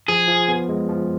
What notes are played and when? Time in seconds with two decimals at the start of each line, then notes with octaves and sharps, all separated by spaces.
0.08 F3 G#4
0.28 F3
0.48 B3
0.69 G#3
0.89 F3